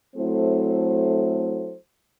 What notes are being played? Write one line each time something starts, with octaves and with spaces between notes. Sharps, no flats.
F#3 A3 C4 E4 A4 C5